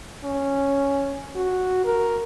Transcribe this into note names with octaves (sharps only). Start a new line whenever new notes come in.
C#4
F#4
A#4